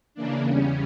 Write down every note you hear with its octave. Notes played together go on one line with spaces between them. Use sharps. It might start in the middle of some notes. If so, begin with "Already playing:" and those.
C#3 E3 A#3 D4
E2 C#3 G3 C#4